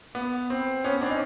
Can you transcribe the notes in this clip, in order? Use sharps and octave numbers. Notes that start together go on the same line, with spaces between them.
B3
C4
B3 C#4
C4 D4
C#4 D#4